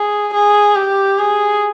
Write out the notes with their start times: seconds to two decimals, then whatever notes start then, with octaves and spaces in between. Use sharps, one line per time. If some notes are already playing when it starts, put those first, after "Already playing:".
Already playing: G#4
0.34 G#4
0.75 G4
1.19 G#4